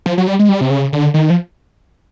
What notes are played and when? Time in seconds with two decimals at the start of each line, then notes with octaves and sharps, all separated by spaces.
0.06 F3
0.18 F#3
0.27 G3
0.39 G#3
0.49 G3
0.61 C3
0.70 C#3
0.93 D3
1.14 D#3
1.30 F3